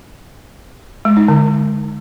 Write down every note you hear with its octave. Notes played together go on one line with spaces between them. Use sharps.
G#3
D#4
D3